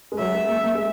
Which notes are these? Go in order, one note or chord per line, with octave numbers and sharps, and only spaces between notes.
G#3
F#3 E5
G#3
A#3
A#3
G#3